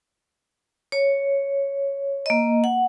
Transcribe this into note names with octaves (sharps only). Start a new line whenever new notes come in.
C#5
A#3 D#5
F#5